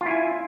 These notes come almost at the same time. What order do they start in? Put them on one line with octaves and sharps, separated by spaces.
F4 E4 G#5